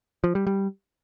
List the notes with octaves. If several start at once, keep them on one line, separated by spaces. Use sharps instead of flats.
F3
G3
G3